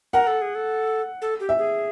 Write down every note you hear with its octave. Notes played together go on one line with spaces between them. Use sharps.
A#4 F#5
A4
G#4
A4
A4
G4
E5
G#4